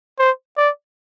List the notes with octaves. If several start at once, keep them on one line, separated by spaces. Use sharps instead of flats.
C5
D5